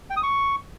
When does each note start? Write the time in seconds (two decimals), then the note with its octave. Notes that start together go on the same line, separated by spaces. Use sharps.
0.10 G5
0.16 D#6
0.23 C#6